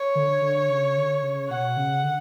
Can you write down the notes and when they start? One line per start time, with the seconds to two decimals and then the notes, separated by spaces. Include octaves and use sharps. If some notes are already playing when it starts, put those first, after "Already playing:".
Already playing: C#5
0.15 D3
0.42 D3
0.69 C#3
0.96 D3
1.22 C#3
1.49 B2 F#5
1.76 C#3
2.03 D3